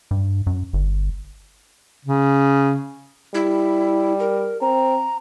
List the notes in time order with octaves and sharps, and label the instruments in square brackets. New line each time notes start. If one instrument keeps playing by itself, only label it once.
[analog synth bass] G2
F#2
G1
[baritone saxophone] C#3
[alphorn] G3 [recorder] E4
[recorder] A#4
[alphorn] C4 [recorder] A#5